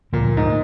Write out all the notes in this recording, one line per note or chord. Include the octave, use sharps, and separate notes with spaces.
D2 A#2 D3 F3 A#3
G#2